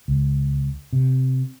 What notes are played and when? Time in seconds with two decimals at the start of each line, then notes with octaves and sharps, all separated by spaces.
0.08 C#2
0.93 C3